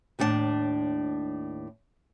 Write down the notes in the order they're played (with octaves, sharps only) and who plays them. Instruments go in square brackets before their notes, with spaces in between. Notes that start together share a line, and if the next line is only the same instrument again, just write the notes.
[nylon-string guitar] D#2 A2 D4 F#5 A5